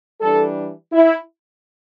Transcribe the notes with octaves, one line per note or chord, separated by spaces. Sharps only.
E3 G3 D4 A4
E4